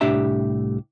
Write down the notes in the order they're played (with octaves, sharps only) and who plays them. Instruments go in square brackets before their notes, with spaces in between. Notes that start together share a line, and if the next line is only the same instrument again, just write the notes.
[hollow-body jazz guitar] C2 A2 D4 G4 E5 A#5